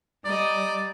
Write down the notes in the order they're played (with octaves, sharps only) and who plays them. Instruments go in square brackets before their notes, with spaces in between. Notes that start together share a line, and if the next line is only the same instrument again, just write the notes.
[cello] G3 [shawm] D5 [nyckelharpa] D#5 A#5